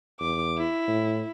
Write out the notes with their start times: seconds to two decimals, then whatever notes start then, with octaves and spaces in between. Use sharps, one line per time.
0.20 E2 D6
0.58 E4
0.88 A2